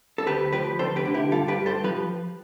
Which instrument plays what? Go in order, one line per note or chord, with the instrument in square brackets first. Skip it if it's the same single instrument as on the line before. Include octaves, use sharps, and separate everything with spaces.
[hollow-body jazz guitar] A4
D2 G4 B4
F3 G4 B4
D2 A4 C5
G4 B4
D3
E4 G4
G2 F4 A4
G4 B4
G2
A4 C5
F3 G4 B4